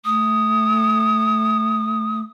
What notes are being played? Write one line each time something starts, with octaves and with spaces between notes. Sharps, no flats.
A3 D#6